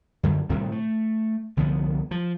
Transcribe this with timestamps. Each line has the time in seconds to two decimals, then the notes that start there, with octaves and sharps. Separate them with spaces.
0.23 F#2 D3
0.49 A2 C3 D#3 G3
0.72 A3
1.57 C2 D3 F3 B3
2.11 F3